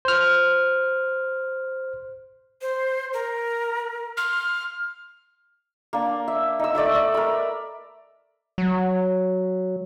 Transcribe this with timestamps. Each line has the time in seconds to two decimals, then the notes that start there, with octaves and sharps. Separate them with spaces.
0.05 C5 F6
2.61 C5
3.13 A#4
4.17 C6 F6
5.93 A#3 D4
6.28 E5
6.59 D#4 E6
6.75 A3 D5 E5 E6
6.95 D5
7.14 A#4 B5
8.58 F#3